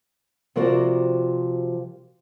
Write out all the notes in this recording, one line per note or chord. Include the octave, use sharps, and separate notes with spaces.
C3 F3 F#4 A#4 D5